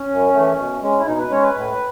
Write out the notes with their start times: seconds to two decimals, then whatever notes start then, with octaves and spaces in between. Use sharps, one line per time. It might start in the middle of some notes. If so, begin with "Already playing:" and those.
Already playing: C#4
0.10 F#2
0.34 E3 A3
0.58 B2
0.82 G#3 C#4
0.99 E4
1.06 B2 D#4
1.19 B4
1.30 G#3 C#4 C#5
1.42 B4
1.54 A2